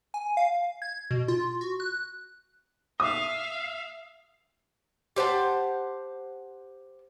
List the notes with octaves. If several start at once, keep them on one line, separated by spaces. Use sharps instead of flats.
G#5
F5
G#6
B2
F4
F#4
F#6
E5 F5 D#6
G4 C5 F#5 A5